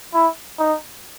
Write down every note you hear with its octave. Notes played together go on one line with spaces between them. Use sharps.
E4
D#4